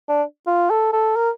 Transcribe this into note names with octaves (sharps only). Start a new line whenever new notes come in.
D4
F4
A4
A4
A#4